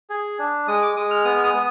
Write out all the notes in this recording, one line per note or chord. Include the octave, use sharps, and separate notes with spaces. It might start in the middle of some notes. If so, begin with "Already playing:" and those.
G#4
D4
G#3 D#6
D6
G#3 D#6
F6
B3 D#6
F6
D#6
B3